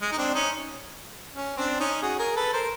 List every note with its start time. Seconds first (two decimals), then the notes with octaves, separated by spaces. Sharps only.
0.02 G#3
0.12 D#4
0.18 C4 D4
0.34 C#4 D#4
1.35 C#4
1.57 C4 D4
1.80 C#4 D#4
2.02 F#4 G#4
2.19 G#4 A#4
2.36 A4 B4
2.53 A#4 C5